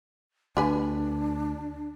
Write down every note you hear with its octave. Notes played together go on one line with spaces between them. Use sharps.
D2 D4 G4 B4 G#5